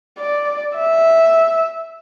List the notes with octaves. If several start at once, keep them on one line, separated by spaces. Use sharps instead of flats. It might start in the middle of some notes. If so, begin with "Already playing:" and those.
D5
E5